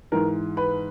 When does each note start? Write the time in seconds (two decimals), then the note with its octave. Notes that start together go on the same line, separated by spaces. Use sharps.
0.12 G#2 E3 A#4
0.57 B4